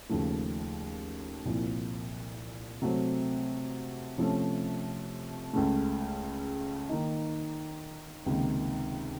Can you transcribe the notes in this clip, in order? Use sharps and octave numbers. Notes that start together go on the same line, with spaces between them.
D#2 C#3 F3 A3
C2 A#2 F3
C3 F#3 A3 C4
C3 F3 A3 C#4
C#2 C#3 A3
D#3 A#3 D#4
C#2 C3 D#3 A#3